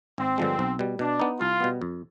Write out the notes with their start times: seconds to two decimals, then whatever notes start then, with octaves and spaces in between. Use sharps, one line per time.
0.18 G#1 C4
0.38 G2 D3 F3 G#3
0.59 B1
0.79 B2 G3
0.99 B2 D4
1.19 B3 D#4
1.40 C2 F4
1.60 B2 G3 B3
1.81 F2